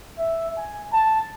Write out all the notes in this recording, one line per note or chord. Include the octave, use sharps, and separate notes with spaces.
E5
G#5
A5